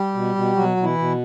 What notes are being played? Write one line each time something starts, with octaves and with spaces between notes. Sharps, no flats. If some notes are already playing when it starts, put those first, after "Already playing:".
Already playing: G3 G4
B2
B2
B2 F#3 F#4
B2
E3 E4
B2